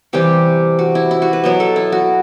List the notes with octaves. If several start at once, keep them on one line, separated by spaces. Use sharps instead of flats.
C3 E3 G3 G4
F#4
E4
E4
F#4
B4
B2 F#3 B3
A4
E4
F#4